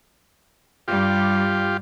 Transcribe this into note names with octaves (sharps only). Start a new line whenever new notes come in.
G2 G3 F4 G4